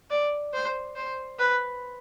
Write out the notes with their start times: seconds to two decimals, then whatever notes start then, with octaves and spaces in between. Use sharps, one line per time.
0.10 D5
0.53 C5
0.96 C5
1.39 B4